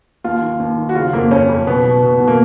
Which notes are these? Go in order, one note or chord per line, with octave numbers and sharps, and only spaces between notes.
D#2 F4
D#3
D#2
D#3
F#4
C#3 F4
F2 A#3
F2 C#4
F2
B2 B3
B2
B2
B2
A#3